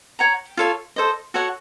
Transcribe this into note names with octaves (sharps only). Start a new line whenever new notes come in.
C#5 F#5 A#5
F4 A4 C#5 F5
A4 C5 D#5
F#4 A4 C#5 F#5